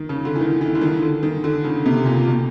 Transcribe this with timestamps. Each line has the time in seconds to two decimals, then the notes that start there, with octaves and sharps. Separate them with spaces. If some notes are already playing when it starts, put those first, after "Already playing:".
Already playing: D#3
0.09 C#3
0.25 D3
0.35 E3
0.41 D#3
0.61 E3
0.75 D3
0.81 D#3
1.02 D3
1.23 D#3
1.44 D3
1.64 C#3
1.86 C3
2.05 A#2
2.27 B2